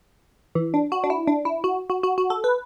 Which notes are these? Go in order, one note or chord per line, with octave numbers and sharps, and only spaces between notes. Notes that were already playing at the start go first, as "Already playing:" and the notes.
E3
D4
F#4
D4
E4
D4
E4
F#4
F#4
F#4
F#4
A4
B4